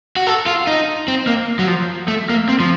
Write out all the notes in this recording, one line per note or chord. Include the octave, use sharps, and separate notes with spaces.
F#4
A4
F4
D#4
C4
A#3
F#3
F3
A3
A#3
C4
F3